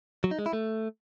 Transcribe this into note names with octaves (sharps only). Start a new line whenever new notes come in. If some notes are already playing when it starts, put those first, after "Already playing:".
F#3
D#4
G#3
E4
A3